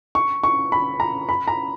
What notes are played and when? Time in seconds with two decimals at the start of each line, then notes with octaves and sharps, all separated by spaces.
0.15 C#6
0.43 C#6
0.72 B5
1.00 A#5
1.29 B5
1.48 A#5